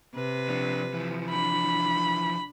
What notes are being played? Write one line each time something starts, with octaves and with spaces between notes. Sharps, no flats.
C3 B4
F3 D4
E3 F3
D4 B5